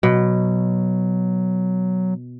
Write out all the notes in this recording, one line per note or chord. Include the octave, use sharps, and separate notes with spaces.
B2 F#3